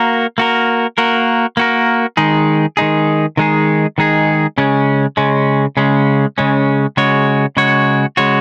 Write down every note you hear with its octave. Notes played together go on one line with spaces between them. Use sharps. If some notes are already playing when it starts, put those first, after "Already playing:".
Already playing: A#3 F#4 A#4
A#3 F#4 A#4
A#3 F#4 A#4
A#3 F#4 A#4
D#3 G#3 D#4 G#4
D#3 G#3 D#4 G#4
D#3 G#3 D#4 G#4
D#3 G#3 D#4 G#4
C#3 G#3 C#4
C#3 G#3 C#4
C#3 G#3 C#4
C#3 G#3 C#4
C#3 G#3 F#4 C#5
C#3 G#3 F#4 C#5
C#3 G#3 F#4 C#5